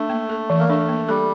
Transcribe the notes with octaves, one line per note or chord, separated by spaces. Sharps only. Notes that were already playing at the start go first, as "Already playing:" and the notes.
Already playing: A3 D4
A#3
A4
E3
A#3
A3 D4
A#3
G3 A4